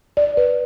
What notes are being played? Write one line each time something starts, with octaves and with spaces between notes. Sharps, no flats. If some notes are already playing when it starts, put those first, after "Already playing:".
D5
B4